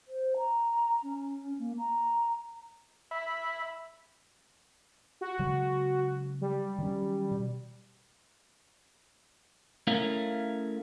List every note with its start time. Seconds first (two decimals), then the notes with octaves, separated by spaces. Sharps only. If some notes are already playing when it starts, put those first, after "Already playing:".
0.08 C5
0.37 A#5
1.03 C#4
1.59 A#3
1.78 A#5
3.11 E5 B5
5.21 F#4
5.39 C#3 F#3 G#3
6.41 G3
6.79 D#3 F#3 C#4
7.31 B2
9.87 A3 C#4 E4 A#4 F5